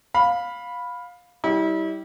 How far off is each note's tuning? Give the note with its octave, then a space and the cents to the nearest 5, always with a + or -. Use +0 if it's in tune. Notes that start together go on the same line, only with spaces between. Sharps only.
F5 +20 B5 +0
G3 -15 E4 -35